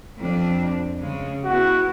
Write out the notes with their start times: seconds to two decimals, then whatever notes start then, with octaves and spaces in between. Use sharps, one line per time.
0.18 F2 C4 D4
0.99 C#3 G#3
1.45 B3 E4 F#4